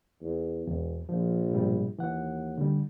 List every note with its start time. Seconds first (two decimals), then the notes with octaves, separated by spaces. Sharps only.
0.22 E2
0.67 E1 E2
1.09 A#1 F3
1.51 G#2 B2 G3
1.99 D#2 E3 F#5
2.58 D3 G3